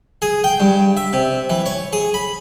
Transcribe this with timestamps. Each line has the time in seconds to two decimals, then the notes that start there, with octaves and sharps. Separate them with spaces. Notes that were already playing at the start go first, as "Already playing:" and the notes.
0.22 G#4
0.44 G5
0.60 G2
0.97 E5
1.13 C3
1.49 E3
1.66 C#5
1.93 G#4
2.14 B5